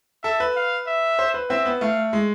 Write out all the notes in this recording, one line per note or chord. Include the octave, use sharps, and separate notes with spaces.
A4 E5
B4
F5
E5
C5
B4
C4 E5
B3
A3 F5
G#3